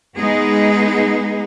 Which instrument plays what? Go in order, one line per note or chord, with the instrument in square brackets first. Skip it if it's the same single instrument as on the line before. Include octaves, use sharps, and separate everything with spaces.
[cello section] G#3 B3 D#4 G#4